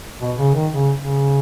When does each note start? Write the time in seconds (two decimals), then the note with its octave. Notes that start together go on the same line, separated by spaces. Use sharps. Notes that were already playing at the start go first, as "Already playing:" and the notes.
0.21 B2
0.38 C#3
0.55 D#3
0.72 C#3
0.97 C#3